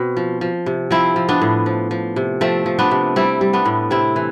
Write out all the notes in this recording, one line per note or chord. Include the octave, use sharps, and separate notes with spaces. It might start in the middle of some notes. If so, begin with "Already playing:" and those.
Already playing: B2 C4
F3
F3
C3
F3 C4 E4
F3
B3 D4
A2
F3
F3
C3
F3 A3 C4
F3
B3 D4
C3
G3 C4 E4
G3
B3 D4
A2
C3 C4 E4
E3